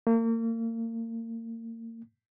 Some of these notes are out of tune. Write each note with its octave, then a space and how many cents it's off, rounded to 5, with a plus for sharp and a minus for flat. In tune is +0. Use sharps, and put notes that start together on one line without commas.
A#3 -35